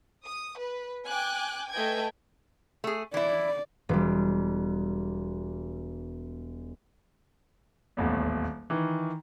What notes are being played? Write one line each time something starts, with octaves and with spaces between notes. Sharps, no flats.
D#6
B4
G5 G#5 D6 F#6
A3 B4 D#5 G5 G#5 G#6
A3 G#4
E3 E4 D5
E1 G3
D#1 A1 E2
D#3 E3